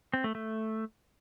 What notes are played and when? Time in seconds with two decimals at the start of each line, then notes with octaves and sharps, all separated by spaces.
0.14 C4
0.24 A3
0.35 A3